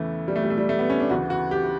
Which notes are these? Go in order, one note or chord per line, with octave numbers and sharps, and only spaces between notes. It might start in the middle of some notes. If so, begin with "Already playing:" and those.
Already playing: E2 C#3 E3 A3
G3
A3
G3
A3
G3
A3
B3
C#4
D4
D2 C#3 E3 F#4
F#4
G4